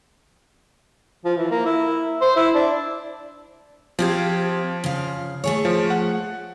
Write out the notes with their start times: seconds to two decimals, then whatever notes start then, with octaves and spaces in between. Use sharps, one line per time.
1.25 F3
1.37 E3
1.51 A#3
1.66 E4
2.21 C5
2.36 E4
2.55 D4
3.99 F3 C4 G4 F5 G#6
4.84 C#3 F5
5.44 A3 G#4 C#5
5.65 F3
5.90 F#5